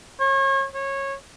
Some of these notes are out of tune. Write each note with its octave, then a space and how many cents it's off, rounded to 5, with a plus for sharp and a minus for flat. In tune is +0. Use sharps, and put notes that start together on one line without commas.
C#5 -35
C#5 -20